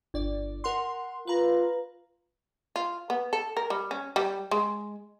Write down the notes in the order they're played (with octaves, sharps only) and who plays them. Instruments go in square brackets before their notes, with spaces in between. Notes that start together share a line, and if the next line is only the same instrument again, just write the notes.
[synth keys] G1 D5
A#4 F#5 C6
[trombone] F4 [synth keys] B4 A#5
[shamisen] F4
B3
A4
A#4
G3
C#4
G3
G#3